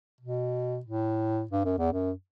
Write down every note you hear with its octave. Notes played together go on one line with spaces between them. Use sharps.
B2
A2
G2
F#2
E2
F#2